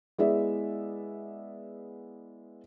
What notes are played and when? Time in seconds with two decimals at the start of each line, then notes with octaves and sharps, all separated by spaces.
0.18 G#3 B3 E4 G#4 D5 E5